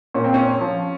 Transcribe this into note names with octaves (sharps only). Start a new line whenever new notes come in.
A#2 C#4
C4
C#4
F3